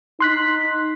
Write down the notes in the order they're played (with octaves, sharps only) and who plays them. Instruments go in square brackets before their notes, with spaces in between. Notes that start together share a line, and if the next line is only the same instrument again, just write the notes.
[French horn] D#4 [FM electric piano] C6 F#6 B6